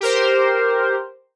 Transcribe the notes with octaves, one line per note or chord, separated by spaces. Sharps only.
G4 A#4 C5